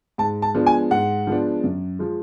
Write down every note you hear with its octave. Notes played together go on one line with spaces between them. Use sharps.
G#2 A5
A5
F3 G#3 B3 D4
G#5
G#2 F#5
F3 G#3 B3 D4
F#2
F3 G#3